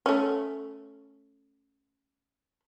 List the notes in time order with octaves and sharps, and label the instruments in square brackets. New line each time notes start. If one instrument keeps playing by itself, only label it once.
[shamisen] A3 C#4